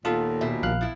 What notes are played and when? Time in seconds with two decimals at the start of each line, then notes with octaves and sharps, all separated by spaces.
0.05 D#2 A#2 B3 F4 A4 F5
0.41 B2 E5
0.63 A#1 F5 F#6
0.81 F3 E4